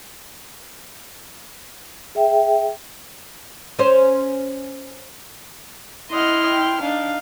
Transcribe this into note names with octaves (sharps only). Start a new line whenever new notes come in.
G#4 E5 G5
C#4 C5
E4 D#5 F#5 C6 F6
G5
D4 D#4 F5